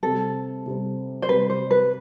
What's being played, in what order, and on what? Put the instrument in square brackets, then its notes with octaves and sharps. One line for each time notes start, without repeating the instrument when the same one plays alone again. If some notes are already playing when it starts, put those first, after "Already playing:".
[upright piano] C3 G3 C4 [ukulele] A4
[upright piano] C3 G3 C4
[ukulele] C5
[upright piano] C3 G3 C4 [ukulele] B4
[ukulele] C5
B4